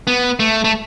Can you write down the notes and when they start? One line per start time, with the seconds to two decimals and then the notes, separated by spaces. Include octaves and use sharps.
0.07 B3
0.40 A3
0.64 A3